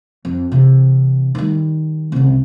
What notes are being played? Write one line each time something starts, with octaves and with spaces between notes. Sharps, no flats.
F2
C3 E3
D#3 G3
C2 C#3